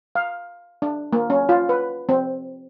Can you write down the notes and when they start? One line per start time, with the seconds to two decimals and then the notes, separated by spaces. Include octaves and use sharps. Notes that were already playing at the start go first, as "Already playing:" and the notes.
0.15 F5
0.82 D4
1.13 A#3
1.30 C#4
1.49 F4
1.69 B4
2.09 C4